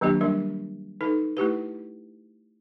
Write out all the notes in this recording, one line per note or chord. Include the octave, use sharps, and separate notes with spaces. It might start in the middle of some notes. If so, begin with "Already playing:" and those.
D#3 F#3 A#3 D4 G4
G3 D4 A#4
D#4 A4 B4
A3 E4 G4 B4